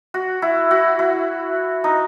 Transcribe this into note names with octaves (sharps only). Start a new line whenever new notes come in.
F#4
E4
F#4
E4
D#4